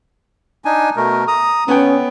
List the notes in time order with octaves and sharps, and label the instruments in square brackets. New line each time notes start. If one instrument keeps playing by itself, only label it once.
[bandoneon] D4 D#4 G#5
B2 A3 A#4
A#5 D#6
[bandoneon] D3 [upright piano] B3 C#5 G5 [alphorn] C#4